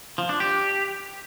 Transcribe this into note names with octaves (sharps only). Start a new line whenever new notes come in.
F3
D4
G4